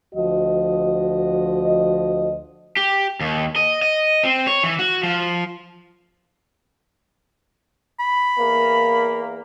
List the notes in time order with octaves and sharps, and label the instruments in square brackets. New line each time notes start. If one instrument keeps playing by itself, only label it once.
[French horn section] D2 F3 F#4 D#5
[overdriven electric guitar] G4
D#2
D#5
D#5
C4
C#5
E3
F#4
F3
[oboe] B5
[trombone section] E2 A#3